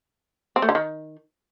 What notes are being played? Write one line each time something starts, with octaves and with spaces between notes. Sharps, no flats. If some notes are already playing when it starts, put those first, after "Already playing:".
C4
A3
D3
D#3